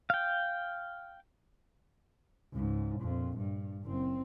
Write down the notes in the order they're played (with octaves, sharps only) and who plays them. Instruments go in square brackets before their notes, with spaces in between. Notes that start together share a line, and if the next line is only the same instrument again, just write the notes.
[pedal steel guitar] F5 G5
[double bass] C#2 G#2
A#1 F2
G2
F#1 C4